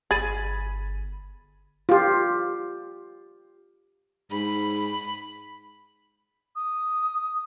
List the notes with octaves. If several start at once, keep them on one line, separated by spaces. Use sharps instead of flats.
G1 G#4 B5 G#6 A6 D#7
F4 G4
G#2 B5
D#6